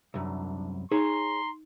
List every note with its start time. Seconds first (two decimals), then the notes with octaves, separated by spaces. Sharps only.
0.14 C2 F#2 D4
0.92 D#4 G#4 C#5 A#5 C6